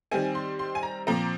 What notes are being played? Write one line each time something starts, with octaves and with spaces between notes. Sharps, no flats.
D#3 G3 C4 G#5
C6
C6
G#5
A#5
A#2 F3 C4 A#5